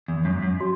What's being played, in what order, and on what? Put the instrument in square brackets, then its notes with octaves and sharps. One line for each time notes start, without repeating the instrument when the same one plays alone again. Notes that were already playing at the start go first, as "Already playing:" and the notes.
[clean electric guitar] E2
F#2
F#2
[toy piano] F#4